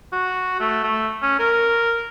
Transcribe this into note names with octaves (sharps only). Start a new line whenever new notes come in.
F#4
A3
A3
C#4
A#4